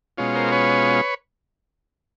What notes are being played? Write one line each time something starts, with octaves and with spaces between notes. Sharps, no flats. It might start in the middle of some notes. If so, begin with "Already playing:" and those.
B2 G#3 C#4 F4
A#4 C5
B4 C#5